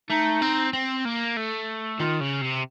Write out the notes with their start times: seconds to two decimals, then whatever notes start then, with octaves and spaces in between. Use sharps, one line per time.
0.10 A3 D#4
0.42 C4
0.73 C4
1.05 A#3
1.37 A3
2.00 D#3 F4
2.20 C#3
2.42 C3